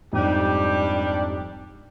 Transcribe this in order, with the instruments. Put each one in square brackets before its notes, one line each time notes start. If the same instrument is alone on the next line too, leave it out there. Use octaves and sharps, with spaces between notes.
[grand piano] F2 G#2 [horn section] G3 D4 G4